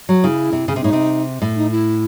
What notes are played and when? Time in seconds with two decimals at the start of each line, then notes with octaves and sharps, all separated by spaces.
0.09 F#3
0.22 C#3 E4
0.52 C3
0.68 C#3
0.76 C3
0.82 A2 D#4
0.93 C3
1.42 A2
1.56 D#4
1.71 E4